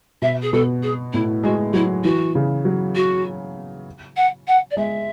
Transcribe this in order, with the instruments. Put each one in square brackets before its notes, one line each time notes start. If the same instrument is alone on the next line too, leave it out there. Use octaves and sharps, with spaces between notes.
[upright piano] B2 [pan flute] E5
[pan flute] G#4
[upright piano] B2 [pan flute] A4
[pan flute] G#4
[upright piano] A2 [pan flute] E4
[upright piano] G#3 [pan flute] F#4
[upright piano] F#3 [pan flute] E4
[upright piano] E3 [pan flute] F#4
[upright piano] C#3
F#3
[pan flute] F#4
F#5
F#5
D5
[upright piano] G#3 [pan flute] E5